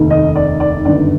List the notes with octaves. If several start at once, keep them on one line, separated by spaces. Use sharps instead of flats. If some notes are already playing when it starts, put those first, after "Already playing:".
Already playing: F1 D#2 D#3
D#5
D5
D5
G1 F#2 D#3 D5